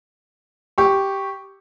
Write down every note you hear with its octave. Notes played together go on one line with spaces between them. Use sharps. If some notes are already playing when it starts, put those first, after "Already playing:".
G4 C#6